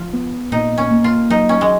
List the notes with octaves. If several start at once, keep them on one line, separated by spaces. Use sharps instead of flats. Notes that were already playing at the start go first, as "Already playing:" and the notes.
Already playing: F3 F4
B3
A#2 D#4
C#4
A#3
F4
F#3 D#4
C#4
G#3